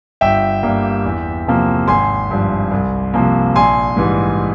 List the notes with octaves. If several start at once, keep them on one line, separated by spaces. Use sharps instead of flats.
G1 E5 G5
G2 G3 A#3
E2
C3 F3 A#3
G#1 G#5 C6
G2 F3
C2
C3 F3 A#3
A#1 G#5 C6
G#2 E3 G3